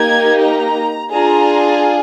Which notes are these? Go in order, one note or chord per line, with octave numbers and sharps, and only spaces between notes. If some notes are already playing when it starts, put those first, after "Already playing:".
Already playing: A#3 D#4 G4 G#6
A#5
D4 F4 G#4 A#5